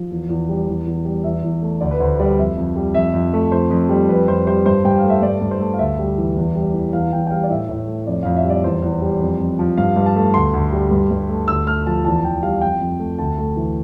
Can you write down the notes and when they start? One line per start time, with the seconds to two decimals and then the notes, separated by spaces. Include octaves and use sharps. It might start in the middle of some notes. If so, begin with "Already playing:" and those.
Already playing: F3
0.11 E2
0.29 E2
0.49 G3
0.68 E2
0.86 E2
1.05 G3
1.24 E2 E5
1.43 E2
1.62 A3
1.81 D2 D5
1.91 B4
2.00 D2 C5
2.20 G3 D5
2.38 F2 E5
2.57 F2
2.76 G3
2.94 F2 E5
3.14 F2
3.34 A3
3.51 F2 C5
3.70 F2
3.89 G3
4.09 F2 B4
4.28 F2 C5
4.47 G3 C5
4.66 G2 C5
4.85 G2 G5
4.98 F5
5.04 A3
5.10 E5
5.22 G2 D5
5.41 G2
5.51 C5
5.60 A3
5.74 F5
5.79 D2 E5
5.99 G3
6.18 E3
6.36 E2
6.55 G3
6.74 E3
6.93 E2 F5
7.12 E2 G5
7.27 G5
7.31 G3 F5
7.44 D5
7.50 A2 E5
7.69 A2
7.88 A3
8.07 F2 D5
8.23 F2 F5
8.37 E5
8.44 G3
8.50 D5
8.64 E2 C5
8.82 E2
9.02 G3
9.21 F2
9.40 F2
9.59 F3
9.78 G2 F5
9.96 G2
10.06 A5
10.16 A3
10.34 D2 C6
10.53 D2
10.72 G3
10.91 G2
11.11 G2
11.29 A3
11.48 D2 E6
11.67 A3 F6
11.87 F3 A5
12.05 E2 A5
12.24 E2 G5
12.43 G3 F5
12.61 F2 G5
12.81 F2
12.99 A3
13.19 D2 A5
13.38 A3
13.57 E3